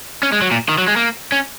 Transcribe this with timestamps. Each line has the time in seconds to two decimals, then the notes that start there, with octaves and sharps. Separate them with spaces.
0.23 C#4
0.32 G#3
0.42 F#3
0.51 A#2
0.69 D#3
0.78 F#3
0.88 G#3
0.96 A#3
1.32 C#4